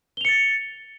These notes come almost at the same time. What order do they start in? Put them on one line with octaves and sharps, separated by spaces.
G7 F7 C#7 A6